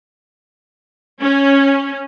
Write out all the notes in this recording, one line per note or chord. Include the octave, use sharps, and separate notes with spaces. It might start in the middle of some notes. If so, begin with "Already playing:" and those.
C#4